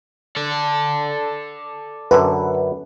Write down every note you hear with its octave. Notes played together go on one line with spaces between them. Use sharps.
A4 D5
F#2 D3 B4